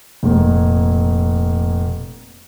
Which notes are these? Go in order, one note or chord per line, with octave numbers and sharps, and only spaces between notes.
F1 A#2